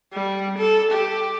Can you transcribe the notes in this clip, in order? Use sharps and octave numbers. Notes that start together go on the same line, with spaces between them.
G3
A4
G4